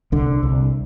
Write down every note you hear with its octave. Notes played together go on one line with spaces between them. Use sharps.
C2 D3
C2